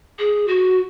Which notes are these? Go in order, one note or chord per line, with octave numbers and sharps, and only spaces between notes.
G#4
F#4